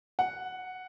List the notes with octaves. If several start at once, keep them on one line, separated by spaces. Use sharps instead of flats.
F#5